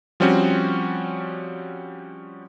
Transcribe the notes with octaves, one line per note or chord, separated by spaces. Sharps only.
F3 G3 C4 C#4 F#4